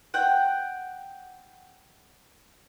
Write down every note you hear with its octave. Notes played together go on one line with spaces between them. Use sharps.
F#5 G5